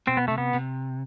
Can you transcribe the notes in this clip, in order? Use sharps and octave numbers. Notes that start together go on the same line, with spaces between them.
B2 C4
B3
C3 A3
B3
C3